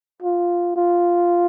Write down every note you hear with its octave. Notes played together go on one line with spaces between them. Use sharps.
F4
F4